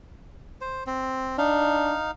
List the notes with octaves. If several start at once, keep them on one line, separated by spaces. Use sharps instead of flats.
C5
C4
D4 D#4 F5